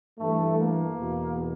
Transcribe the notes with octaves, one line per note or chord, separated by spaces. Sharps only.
G2 E3 A3
A#3
E2 B2